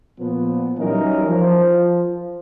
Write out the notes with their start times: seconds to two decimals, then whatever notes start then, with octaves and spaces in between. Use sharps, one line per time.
0.20 A#2 F3 B3
0.78 E3 F#3 G3 C#4 D#4 A#4
1.27 F3